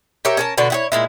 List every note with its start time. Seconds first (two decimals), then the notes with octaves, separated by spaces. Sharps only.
0.25 G4 A#4 C#5 E5
0.37 C#4 A#4 A5
0.58 B2 D3 D4 F#4
0.70 E4 F#4 C#5
0.92 A#2 G#3 E4